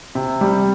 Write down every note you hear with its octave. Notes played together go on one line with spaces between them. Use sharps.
C3
G3